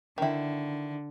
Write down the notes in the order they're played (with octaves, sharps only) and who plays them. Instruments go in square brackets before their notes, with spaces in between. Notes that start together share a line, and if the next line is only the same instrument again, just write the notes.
[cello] D3 [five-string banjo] D#3 E4